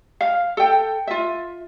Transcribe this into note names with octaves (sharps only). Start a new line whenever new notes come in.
F5
A4 G5
F4 E5